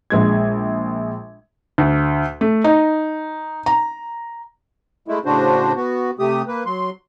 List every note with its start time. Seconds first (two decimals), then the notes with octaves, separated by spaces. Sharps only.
0.10 A#1 G#3 G#6
1.78 D2
2.41 A3
2.64 D#4
3.66 A#5
5.08 G#3 A3 E4
5.25 A2 C#3 D4 F#4 C5
5.75 B3 F#4
6.19 C3 A3 G4 D#6
6.47 A#3 B4
6.66 F#3 C6